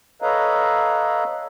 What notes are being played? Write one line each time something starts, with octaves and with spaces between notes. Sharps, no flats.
A4 B4 C#5 D#5 F5 A#5